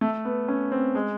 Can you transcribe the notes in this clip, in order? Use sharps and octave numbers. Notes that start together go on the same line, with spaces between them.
A3
B3
C#4
C4
G#3